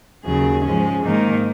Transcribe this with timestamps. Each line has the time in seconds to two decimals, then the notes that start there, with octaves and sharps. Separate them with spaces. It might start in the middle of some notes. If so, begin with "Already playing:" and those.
0.24 D#2 C#3 F#3 G#4
0.63 G#2 F3 G#3 C#4
1.02 G#2 D#3 A#3 D#4